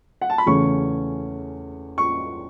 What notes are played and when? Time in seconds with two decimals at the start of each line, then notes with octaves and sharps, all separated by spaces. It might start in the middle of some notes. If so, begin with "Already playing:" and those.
0.21 F#5
0.30 A5
0.38 B5
0.46 E2 C#3 A3 C#4 C#6
1.98 C#6